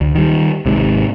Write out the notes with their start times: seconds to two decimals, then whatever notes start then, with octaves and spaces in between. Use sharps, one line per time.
0.01 D2
0.15 D#3 G3
0.66 G#1 G#2 C3